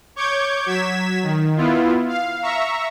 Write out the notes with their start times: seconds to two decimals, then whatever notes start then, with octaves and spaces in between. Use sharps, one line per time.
0.16 C#5 C#6 D6 G6 G#6
0.66 F#3 G#6 B6 E7
1.23 D#3
1.56 B3 E4 F4
2.08 F5
2.43 E5 A#5 C#6